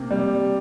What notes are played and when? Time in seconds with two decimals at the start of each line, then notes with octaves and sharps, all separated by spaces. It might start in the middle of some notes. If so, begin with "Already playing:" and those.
Already playing: C3 A#3
0.11 G3